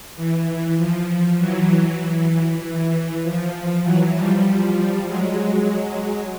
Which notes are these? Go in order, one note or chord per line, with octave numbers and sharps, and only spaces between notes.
E3
F3
E3 F#3
E3
E3
F3
E3 F#3
F3 G3
F#3 G#3